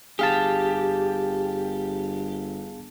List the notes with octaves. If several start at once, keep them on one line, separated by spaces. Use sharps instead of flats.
G1 G4 G#4 F5 A5